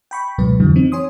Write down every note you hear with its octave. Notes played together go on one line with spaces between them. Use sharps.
G5 B5 C#6
C#2 G#2 B2 F#3 B4
F2 D3 E3 F#3
C4 D#4
C#5 G#5 C6 D#6